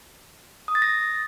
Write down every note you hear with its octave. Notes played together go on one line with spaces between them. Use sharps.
D#6
A6
A#6